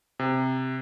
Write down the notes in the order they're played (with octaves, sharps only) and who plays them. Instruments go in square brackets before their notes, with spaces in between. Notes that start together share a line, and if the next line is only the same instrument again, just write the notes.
[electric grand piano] C3